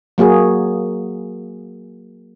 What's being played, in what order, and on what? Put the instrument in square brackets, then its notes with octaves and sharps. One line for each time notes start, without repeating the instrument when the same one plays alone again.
[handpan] F#3 A#3 F#4 G#4